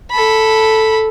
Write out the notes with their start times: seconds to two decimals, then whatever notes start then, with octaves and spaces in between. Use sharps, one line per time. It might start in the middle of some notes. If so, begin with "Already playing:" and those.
0.11 A4 B5